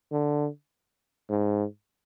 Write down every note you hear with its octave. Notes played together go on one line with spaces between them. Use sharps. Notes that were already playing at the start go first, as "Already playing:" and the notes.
D3
G#2